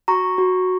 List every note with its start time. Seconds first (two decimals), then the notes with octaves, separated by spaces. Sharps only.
0.08 F#4 A#5 C#6
0.38 F#4